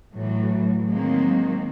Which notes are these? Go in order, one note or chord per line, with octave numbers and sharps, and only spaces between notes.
A2 E3 F#3
D#3 F#3 G#3 A#3 C4